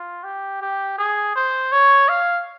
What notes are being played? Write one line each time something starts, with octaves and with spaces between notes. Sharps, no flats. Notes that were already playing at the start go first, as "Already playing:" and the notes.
Already playing: F4
G4
G4
G#4
C5
C#5
F5